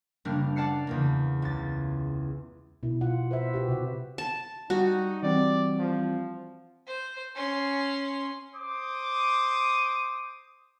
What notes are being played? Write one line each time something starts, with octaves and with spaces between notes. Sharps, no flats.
F#1 G3 A#3 D4 F6
D5 F#5 A5 F6 C7 C#7
E2 C#3 A#3
C#2 A6
B2 E4
F4 F#5
B4 C5 E5
F#4 G4
C3 F#4
A5
G3 D#4 F#4
E3 G3 C4 D5
F3
C5
C#4 C6
C5 D6 D#6